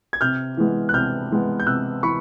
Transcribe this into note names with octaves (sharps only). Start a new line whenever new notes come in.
G#6
C3 F6 G6
E3 G#3 B3
F#6
C3 F6 G6
E3 G#3 B3
G6
C3 E6 F#6
E3 B5 C#6